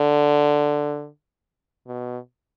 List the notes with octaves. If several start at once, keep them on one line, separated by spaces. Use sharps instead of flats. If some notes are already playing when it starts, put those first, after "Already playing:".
Already playing: D3
B2